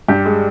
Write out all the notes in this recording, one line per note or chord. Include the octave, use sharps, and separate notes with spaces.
G2 G4
G#3